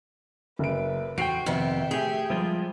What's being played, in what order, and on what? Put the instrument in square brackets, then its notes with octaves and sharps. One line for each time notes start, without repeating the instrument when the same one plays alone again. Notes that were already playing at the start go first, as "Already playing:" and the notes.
[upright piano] F#1 D7 [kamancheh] B4
[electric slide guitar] E2 F4 G5 [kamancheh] A3 C5 [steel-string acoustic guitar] F#4 [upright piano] C7 D7
[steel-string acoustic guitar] F2 C3 B3 [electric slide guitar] D#3 [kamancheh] E5 G5
[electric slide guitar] A3 G4 [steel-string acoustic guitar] G#4
[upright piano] F3 [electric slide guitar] G3 G#3 F4